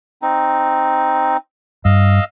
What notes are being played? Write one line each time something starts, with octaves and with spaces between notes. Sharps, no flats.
C4 D#4
G2 D#5 F5 E6